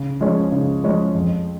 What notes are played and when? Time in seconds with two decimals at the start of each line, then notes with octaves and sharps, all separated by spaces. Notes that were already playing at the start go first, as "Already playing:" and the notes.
Already playing: C#3
0.20 F3 G#3 C#4 G#4
0.52 C#3
0.83 F3 G#3 C#4 G#4
1.15 F2